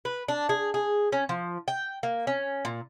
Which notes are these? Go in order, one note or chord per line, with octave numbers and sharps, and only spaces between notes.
B4
D4
G#4
G#4
C#4
F3
G5
A#3
C#4
A#2